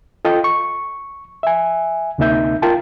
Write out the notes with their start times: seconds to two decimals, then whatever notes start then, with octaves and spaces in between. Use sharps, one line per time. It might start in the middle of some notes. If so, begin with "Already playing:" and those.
0.25 F4 A4 D#5 G5
0.44 C#6
1.43 E5 G#5
2.18 D2 C3 A#3 D#4 E5 G6
2.62 F4 A#4 G5 A5